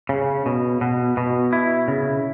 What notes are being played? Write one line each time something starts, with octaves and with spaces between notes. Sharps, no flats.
C#3
B2
B2
B2
E4
C#3